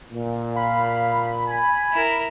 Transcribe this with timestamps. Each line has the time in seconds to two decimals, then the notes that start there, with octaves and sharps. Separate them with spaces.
0.12 A#2
0.56 F5 B5
1.47 G#5
1.92 E4 A#4